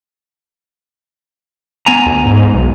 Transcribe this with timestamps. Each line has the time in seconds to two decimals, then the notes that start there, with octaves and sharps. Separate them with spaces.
1.86 B3 G#5 A#5
2.06 D2
2.26 G#2
2.54 B1